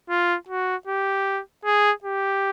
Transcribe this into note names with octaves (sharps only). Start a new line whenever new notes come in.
F4
F#4
G4
G#4
G4